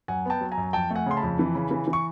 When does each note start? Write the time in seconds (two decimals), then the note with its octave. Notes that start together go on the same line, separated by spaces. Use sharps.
0.08 F#2 F#5 G#5
0.25 B3 G5 A5
0.41 F#3
0.52 G#5 A#5
0.58 F#2
0.73 F2 G5 A5
0.90 A3
0.95 F#5 G#5
1.06 C#3 C6
1.17 A5 B5
1.23 F2
1.39 E3
1.55 C#3
1.71 E3
1.87 E3
1.93 C#6